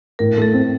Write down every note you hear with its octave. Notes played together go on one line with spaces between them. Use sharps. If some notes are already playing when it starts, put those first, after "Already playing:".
A2 A#4
A3 A4
C4